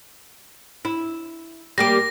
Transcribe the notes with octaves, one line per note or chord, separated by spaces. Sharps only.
E4
G3 A#3 G4 A#6